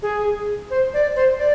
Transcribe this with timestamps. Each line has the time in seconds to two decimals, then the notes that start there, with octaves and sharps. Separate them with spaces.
0.02 G#4
0.71 C5
0.94 D5
1.16 C5
1.39 D5